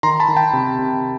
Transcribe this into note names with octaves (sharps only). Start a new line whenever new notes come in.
D#3 A#5 C6
A5 B5
D#3
G5 A5
C3
C3